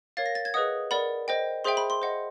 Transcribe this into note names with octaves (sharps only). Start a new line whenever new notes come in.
A#4 C#5 F5 A6
A#6
A6
G#6
G#4 B4 D#5 F#5 D#6
A#4 D5 F#5 B5
C5 D#5 G5
G#4 C5 E5 G5 C6
B5
C6
C5 D#5 F#5